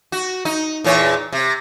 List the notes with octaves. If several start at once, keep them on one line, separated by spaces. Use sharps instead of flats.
F#4
D#4
E2 A#2 C#5
C3